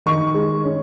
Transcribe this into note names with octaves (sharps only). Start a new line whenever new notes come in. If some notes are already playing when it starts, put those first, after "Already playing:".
D#3 C#6
G#3
C#4